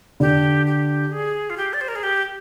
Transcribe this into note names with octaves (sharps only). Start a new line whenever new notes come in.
D3 G4
G4
G#4
F4
G4
D5
C5
A#4
G#4
G4